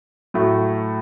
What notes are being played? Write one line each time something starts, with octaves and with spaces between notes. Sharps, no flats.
A2 F#3 A3